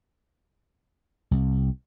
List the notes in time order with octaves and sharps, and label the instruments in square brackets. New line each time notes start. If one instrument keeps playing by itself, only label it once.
[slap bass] C2